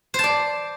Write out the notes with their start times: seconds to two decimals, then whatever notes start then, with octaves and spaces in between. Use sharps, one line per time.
0.14 C5
0.19 A5
0.24 D5